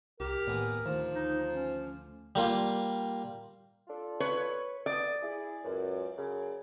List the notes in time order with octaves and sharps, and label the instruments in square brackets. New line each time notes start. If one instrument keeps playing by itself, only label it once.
[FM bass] C2 [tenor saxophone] G4 [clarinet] A#4
[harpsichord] D#2 B3 G#4 [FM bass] A2
[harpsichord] D2 [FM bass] D#3 [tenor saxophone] F3
[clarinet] D#4
C#4
[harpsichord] G3 A#3 F4
[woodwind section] D4 F4 A4
[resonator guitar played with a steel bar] B4 C#5
[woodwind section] B3 A4 D#6 [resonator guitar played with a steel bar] D5
[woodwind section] E4 G#4
C#2 F#2
F#2 C#3